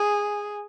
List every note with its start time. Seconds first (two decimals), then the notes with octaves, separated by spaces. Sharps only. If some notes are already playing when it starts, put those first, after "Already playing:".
Already playing: G#4